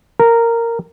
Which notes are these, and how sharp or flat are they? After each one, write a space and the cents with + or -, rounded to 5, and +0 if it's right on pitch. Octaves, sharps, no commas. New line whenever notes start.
A#4 -10